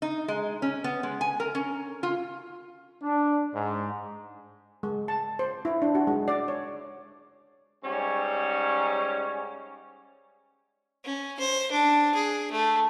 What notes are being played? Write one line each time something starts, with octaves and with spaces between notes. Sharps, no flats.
D#4
G#3
C#4
B3
G#3
G#5
A#4
C#4
F4
D4
G#2
G#3
A5
C5
E4
D4
F#4
G#3
D5
C#5
G#2 G3 C#4
C#4
C5
D4
G#4
A3